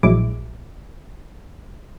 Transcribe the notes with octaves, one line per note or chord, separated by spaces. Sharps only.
A#1 F#3 G#3 E4 D6